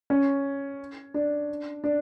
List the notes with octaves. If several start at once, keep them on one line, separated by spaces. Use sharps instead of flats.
C#4
D4
D4